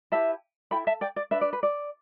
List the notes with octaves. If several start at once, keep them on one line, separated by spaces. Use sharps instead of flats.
E4 G4 B4 E5 A5
E4 A4 G5 B5
E5 A5
D5 G5
D5
D4 B4 E5
D5
B4
D5